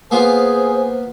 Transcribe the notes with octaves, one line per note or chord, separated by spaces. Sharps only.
A#3 B3 F4 G#4 C5